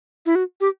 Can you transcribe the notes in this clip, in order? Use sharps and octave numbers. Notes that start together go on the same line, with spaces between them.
E4
F#4
G4